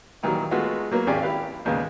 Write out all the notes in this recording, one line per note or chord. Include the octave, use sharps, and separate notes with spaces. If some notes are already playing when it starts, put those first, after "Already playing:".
A#2 D#3 E3 F#3 G3
G#3 A3 B3 F4 F#4
F#3 A#3 B3
G#1 D#2 C#4 G4 G#4 D5
E4 G4 B4 F5
A#1 D#2 C#3 G#3 B3